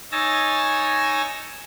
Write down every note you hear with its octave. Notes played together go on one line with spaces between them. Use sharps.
D#4 C#5 G#5 E6 A6 A#6